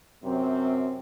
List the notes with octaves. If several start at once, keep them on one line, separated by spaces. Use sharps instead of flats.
F#2 C3 C4